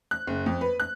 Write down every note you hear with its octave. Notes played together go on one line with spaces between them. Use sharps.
F#6
F#1
F2
B4
F#6